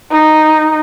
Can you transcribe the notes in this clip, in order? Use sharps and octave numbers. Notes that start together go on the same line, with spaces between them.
D#4